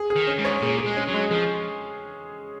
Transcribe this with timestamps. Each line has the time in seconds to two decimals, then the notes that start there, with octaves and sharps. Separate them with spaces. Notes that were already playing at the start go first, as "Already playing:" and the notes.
Already playing: G#4
0.10 G#4
0.16 D#3
0.27 C#4
0.38 G#2
0.45 C#5
0.62 A#2 G#4
0.79 G#4
0.86 G#3
0.97 C#4
1.08 F#3
1.14 G#3
1.31 F3 G#4